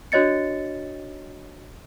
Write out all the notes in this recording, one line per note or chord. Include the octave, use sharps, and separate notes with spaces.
D4 F#4 C#5 D#5 A6 C#7